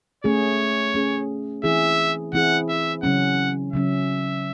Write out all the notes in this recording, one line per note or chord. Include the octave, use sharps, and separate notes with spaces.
A3 C#4 G#4 C#5
A3 C#4 G#4
E3 C4 E4 G#4 E5
E3 C4 E4 G#4 F#5
E5
C#3 F#3 C#4 F#5
C#3 F#3 C#4 E5